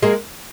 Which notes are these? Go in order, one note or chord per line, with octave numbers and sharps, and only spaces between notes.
G#3 A#3